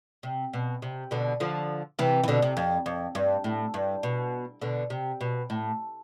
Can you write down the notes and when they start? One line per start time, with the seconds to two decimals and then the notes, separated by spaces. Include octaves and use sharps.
0.23 C3
0.53 B2
0.82 C3
1.11 B2 D3
1.40 D3 F3
1.99 C3 E3
2.23 E3
2.28 B2 D3
2.42 C3
2.57 F2
2.86 F2
3.15 G2
3.44 A2
3.74 G2
4.03 B2
4.61 B2 D3
4.90 C3
5.21 B2
5.50 A2